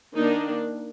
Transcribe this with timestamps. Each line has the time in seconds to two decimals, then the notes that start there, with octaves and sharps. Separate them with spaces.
0.15 D#3 A#3 D4 D#4